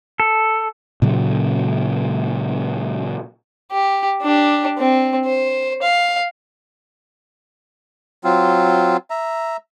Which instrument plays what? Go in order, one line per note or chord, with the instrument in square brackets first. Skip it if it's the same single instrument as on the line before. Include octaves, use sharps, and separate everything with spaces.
[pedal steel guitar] A4
[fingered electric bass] A#2 C#3 F#3
[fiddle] G4
D4 G4
C4
C5
F5
[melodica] F#3 C4 F4
E5 A#5